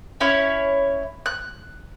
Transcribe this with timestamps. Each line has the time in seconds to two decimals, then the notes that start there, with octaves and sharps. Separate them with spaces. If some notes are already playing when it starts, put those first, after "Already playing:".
0.21 C#4 E4 C#5
1.26 F#6